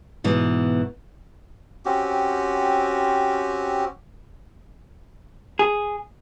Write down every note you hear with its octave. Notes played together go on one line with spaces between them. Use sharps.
G#2 B2 E3 G#3
C4 C#4 F#4 G4
G#4